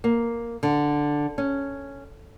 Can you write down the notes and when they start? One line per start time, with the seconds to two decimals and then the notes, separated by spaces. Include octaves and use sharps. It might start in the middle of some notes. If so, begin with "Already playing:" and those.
0.04 A#3
0.63 D3
1.38 C#4